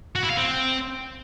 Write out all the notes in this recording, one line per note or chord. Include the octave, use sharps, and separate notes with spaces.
F#4
E4
F5
C4